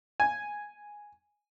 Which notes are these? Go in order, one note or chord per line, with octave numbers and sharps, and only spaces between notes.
G#5